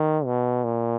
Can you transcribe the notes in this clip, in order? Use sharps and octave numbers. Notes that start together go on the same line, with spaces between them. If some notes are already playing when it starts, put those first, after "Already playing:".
Already playing: D#3
B2
A#2